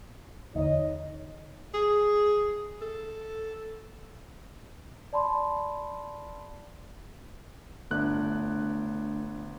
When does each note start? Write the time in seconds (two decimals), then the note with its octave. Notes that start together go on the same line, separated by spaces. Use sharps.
0.55 E2 D3 D#4 C#5 D#5
1.74 G#4
2.82 A4
5.13 D5 A5 B5 C6
7.91 G1 A3 D4 F#6